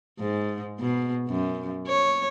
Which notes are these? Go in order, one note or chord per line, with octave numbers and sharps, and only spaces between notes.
G#2
B2
F#2
C#5